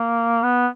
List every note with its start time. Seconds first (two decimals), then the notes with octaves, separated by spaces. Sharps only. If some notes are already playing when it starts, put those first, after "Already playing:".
Already playing: A#3
0.43 B3